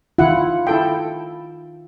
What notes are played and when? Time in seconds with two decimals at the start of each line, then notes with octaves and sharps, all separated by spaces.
0.18 D#3 E4 F4 F#5
0.67 E4 A4 G5